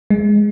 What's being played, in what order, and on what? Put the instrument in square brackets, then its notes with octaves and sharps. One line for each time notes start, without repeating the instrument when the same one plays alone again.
[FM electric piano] G#3